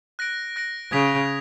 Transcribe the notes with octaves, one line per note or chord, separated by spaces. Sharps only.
F#6 A#6 D7
F#6 A#6 D7
C#3 D#6 G#6 B6 D7 F7